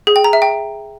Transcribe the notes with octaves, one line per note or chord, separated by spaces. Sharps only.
G#4
G5
A#5
E5
G5